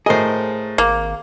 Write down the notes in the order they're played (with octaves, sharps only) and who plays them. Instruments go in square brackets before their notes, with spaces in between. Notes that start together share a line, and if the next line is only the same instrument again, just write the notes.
[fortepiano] A2 A#4 D#5 [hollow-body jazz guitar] G#4 C5
[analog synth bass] G#1 [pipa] A#3